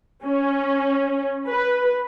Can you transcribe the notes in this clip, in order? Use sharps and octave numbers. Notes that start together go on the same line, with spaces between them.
C#4
B4